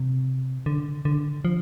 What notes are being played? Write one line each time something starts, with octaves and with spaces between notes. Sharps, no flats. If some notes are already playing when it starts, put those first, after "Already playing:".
Already playing: C3
D3
D3
F3